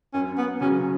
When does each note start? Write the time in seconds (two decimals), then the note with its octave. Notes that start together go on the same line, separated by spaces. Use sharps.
0.13 F#2 C#4
0.38 B3
0.61 C#3 F#3 C#4